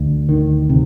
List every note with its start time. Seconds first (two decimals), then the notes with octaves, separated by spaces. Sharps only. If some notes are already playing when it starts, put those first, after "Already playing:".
Already playing: D2
0.29 D#3
0.69 C3